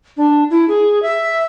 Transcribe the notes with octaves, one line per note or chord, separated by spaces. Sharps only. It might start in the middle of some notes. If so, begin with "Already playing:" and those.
D4
E4
G#4
E5